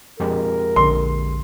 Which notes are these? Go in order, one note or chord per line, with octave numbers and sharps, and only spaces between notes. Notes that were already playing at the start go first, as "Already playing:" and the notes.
F2 G#3 G4 A#4
A#1 D3 C6